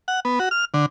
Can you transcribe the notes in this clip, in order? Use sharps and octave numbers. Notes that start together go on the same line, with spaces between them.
F#5
B3
F#4
F6
D3